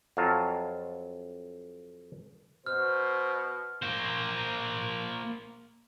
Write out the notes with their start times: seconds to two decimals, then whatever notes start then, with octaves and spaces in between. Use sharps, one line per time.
0.17 F2 F#3 F4 F5 A5
2.66 B2 C5 F6
3.82 A#3 C5